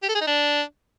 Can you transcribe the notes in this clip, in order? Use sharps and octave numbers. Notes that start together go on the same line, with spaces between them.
G4
A4
G#4
D#4
D4